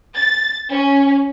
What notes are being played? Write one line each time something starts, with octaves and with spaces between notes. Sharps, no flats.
A6
C#4